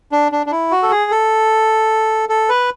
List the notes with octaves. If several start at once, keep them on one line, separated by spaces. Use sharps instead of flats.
D4
D4
D4
E4
F#4
A4
G#4
A4
A4
B4